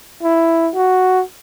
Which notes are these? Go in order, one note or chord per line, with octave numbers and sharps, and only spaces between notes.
E4
F#4